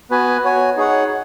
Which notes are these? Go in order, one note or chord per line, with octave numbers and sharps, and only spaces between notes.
B3 F#4 B4 G#5
F#4 C#5 G#5
D#4 G#4 C#5 F#5